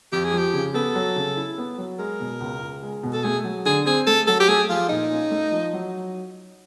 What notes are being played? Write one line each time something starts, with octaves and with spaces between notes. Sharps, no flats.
F2 G4
G#4
F3 G4
C#3
B3 A4
F#3
C#3
E4
B3
F#3
G#3 A#4
B2
C#2
C#2
G#3
B2
A4
A3 G#4
F#3
D3 G#4
C4 G#4
A3 A4
F#3 A4
G4
A3 G#4
F3 F4
A#2 D#4
C#4
A3
F3
F#3